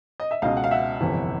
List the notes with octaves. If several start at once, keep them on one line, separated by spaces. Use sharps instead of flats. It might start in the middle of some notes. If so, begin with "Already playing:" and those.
D#5
E5
C#2 B2 D#5 F5
F#5
F5
E5 F#5
G1 F2 C3 E3